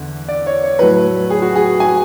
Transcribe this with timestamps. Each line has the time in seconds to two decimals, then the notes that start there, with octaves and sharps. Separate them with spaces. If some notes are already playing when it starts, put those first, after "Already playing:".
Already playing: E2 D3
0.28 D5
0.46 C#5
0.63 C#5
0.79 A2 F#3 A3 B4
1.30 G#4
1.42 F#4
1.55 G#4
1.80 G#5